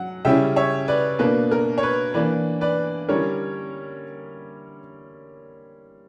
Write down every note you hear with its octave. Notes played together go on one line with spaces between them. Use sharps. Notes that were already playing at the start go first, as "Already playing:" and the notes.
Already playing: F#3 F#5
C#3 G3 C#4 E4 E5 G5
C#5 E5
B4 D5
B2 A#3 D4 B4
A#4
C#5
B4
E3 A#3 D4 B4 D5
B4 D5
D3 G3 C#4 E4 A#4 C#5